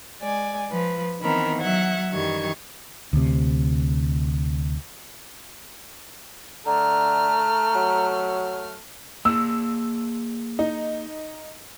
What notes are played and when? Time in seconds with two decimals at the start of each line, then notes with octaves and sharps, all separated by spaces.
0.21 G#3 D5 G#5
0.70 F3 B4
1.21 D#3 E3 B3 C4 A#4 B5
1.61 F#3 E5 F#5 G#6
2.12 F#2 D#3 E3 G3 C#6 G#6
3.13 D2 C3
6.66 D3 A3 A#5 F6
7.75 F#3
9.25 A#3 G#4 E6
10.59 D#4